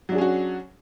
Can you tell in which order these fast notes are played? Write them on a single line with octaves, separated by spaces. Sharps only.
F#3 D4 G#4 C#4 F#4